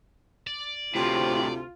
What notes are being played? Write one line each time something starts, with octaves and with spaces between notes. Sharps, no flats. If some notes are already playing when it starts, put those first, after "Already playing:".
D5
D2 A2 C3 C4 F4